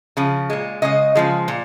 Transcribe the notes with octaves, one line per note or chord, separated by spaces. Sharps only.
C#3 F3
A#2 G#3
C#3 G#3 D#5
C#3 F3 G#3
A#2